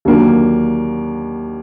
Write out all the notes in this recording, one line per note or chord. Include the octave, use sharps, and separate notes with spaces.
D#2 D3 F#3 A#3 D4